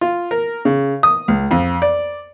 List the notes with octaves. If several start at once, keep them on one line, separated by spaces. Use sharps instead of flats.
F4
A#4
C#3
D#6
C#2
F2
D5